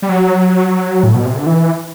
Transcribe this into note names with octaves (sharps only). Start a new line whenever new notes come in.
G3
F#3
A2
B2
C3
D3
E3